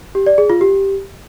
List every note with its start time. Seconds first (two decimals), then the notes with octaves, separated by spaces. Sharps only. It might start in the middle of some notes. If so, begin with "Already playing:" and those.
0.15 G4
0.26 D5
0.38 G#4
0.50 F4
0.61 G4